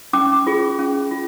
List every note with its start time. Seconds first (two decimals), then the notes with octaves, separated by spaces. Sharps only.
0.13 C#4 D6
0.47 F4 G#4
0.79 C#4
1.11 F4